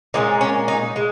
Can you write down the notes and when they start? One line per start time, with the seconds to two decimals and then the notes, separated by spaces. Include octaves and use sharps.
0.14 A#2 G#3 C#4 D#4
0.41 C#4
0.68 D#4
0.96 G#3